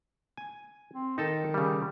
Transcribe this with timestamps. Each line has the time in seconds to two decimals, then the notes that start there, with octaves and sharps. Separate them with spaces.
0.37 G#5
0.94 C4
1.18 D#3 D#4 A4 A5
1.54 C#3 G3